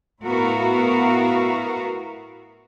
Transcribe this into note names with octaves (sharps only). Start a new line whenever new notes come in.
A2 B3 E4 F#4 A#4 F5